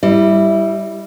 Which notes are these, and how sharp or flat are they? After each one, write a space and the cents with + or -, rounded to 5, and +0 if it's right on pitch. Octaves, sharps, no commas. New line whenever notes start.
G3 -5 E4 +0 D#5 -40